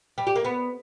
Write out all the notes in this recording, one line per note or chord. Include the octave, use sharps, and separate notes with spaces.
G3
G4
A#3
B3